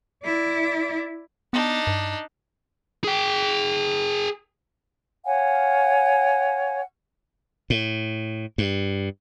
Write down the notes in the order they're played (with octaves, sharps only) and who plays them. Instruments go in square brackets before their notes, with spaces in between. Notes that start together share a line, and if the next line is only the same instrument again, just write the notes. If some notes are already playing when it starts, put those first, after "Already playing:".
[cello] E4 D5
[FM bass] B3 [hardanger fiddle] D4 D#4
[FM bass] G2
[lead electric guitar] G#4 G5
[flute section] C#5 F5 F#5 G#5
[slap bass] A2
G2